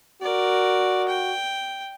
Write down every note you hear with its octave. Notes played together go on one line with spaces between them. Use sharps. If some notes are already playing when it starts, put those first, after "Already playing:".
F#4 A#4 D5
G5